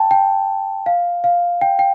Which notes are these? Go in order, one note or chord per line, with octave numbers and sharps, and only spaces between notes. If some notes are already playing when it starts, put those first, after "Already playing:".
Already playing: G5 A5
G5
F5
F5
G5
G5